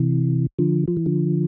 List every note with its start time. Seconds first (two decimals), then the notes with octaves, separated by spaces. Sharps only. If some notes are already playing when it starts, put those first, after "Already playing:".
Already playing: C3 E3
0.59 D3 F3
0.88 F3
0.97 E3
1.06 D3 F3